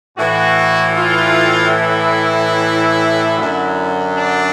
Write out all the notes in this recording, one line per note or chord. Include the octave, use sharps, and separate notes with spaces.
A2 E3 F#4
F4
E4
F#2 D3 F#3
D4